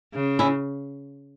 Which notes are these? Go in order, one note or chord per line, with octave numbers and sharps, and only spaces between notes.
C#3
C#4 E4